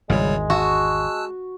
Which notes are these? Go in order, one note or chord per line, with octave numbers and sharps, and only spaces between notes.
G#1 E2 C#3 G3 G#3 C#5
F#4 A5 E6 F#6